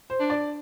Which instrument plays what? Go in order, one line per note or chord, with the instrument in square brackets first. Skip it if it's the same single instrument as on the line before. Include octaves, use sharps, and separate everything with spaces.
[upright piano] C5
[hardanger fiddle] D4
[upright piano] D5